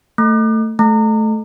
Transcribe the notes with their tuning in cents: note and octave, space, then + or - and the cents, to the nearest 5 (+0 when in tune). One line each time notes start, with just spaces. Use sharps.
A3 +15
A3 -15